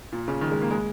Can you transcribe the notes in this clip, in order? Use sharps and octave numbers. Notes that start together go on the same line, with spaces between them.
A#2
C#3
D#3
G#3
A#3
G#3